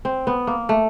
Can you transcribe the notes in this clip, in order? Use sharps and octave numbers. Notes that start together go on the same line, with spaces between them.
C4
B3
A#3
A3